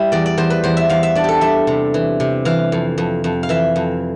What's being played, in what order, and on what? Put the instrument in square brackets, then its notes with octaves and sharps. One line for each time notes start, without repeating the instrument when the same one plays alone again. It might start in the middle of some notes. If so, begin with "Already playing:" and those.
Already playing: [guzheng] G3 E4
E2 D5
D5
E2 C5
B4
E2 C5
E5
E2 F5
E5
D4 D5
G4 A4
G3 E5
C3
E3
C3
E3 F5
F2
F2
F2
F5
E3 E5
F2